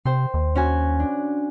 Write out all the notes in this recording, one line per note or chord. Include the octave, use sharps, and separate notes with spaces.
C3 C5 G5 C6
D#2
C#4 F#4 G#5
D4